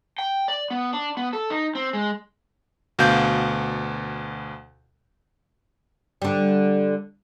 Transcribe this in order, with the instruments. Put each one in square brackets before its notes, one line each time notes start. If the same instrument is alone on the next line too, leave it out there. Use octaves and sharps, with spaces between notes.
[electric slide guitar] G5
D5
B3
D4
B3
A4
D#4
C4
G#3
[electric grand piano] D2 B2 F5 G6
[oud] D3 G3